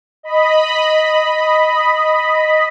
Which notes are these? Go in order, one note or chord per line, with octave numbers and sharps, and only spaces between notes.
D#5 B5